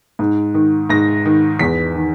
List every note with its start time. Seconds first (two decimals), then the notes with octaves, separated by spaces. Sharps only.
0.19 G#2
0.54 D#3
0.90 G#2 A#6
1.25 D#3
1.59 E2 B6
1.95 D#3